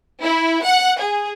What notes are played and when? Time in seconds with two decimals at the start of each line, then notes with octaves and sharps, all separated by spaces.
0.22 E4
0.64 F#5
0.99 G#4